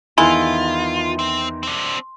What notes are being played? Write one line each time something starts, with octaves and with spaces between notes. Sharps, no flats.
E2 D#3 E3 G#3 E4 F4 C6
C4
C4 D4